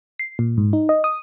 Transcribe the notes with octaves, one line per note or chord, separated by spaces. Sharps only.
C7
A#2
G#2
D#4
D#5
D#6